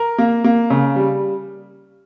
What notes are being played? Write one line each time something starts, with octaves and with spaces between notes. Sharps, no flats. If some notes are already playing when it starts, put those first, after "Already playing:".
Already playing: A#4
A#3
A#3
C#3
G3